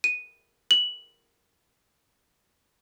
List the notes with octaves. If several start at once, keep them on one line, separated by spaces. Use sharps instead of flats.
D#7
F#7